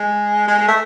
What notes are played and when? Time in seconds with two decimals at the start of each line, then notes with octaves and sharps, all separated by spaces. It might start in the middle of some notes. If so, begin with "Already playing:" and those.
Already playing: G#3
0.48 G#3
0.58 G#3
0.68 A3